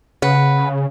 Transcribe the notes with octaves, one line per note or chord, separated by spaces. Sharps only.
C#3 B4 F#5